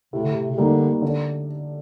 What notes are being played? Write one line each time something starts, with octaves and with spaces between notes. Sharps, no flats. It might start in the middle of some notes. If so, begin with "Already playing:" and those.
A2 C3
D3
C3
C3
D3 G3 A#3 D#4
D3